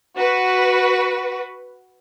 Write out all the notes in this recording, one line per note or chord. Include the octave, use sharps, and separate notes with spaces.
F#4 B4